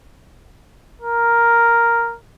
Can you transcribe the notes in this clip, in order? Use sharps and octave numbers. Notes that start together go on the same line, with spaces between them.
A#4